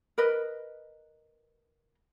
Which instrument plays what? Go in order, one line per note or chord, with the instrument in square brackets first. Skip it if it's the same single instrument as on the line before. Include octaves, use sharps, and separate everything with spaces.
[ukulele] A#4 B4 D#5